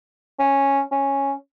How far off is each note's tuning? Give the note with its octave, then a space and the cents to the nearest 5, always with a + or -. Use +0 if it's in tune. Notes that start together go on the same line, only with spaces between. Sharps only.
C#4 -5
C#4 -5